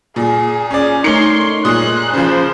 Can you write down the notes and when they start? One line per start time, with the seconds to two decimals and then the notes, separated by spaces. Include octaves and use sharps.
0.16 A#2 G#4
0.71 C#4 G#4 D5
1.04 A3 D#4 A#4 C#5 C6 C#7 F#7
1.65 A#2 G#4 C6 D#6 F#6
2.13 C#3 F3 C5